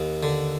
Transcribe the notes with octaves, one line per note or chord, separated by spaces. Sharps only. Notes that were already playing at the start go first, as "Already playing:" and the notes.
Already playing: D#2
D3